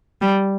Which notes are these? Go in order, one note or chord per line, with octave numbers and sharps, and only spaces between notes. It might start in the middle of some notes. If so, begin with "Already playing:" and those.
G3